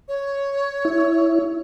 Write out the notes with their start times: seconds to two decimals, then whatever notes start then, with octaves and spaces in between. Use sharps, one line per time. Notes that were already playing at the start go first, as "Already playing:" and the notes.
0.08 C#5
0.85 E4